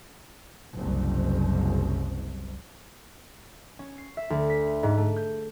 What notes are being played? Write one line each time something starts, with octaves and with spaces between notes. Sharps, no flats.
F#1 C2
C#4
C7
E5
D2
B6
G#2
A3
G6